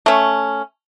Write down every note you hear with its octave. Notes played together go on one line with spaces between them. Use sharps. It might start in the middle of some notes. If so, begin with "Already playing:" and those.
A3 C#4